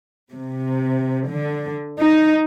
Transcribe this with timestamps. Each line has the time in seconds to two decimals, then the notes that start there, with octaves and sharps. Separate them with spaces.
0.33 C3
1.29 D3
2.00 D#4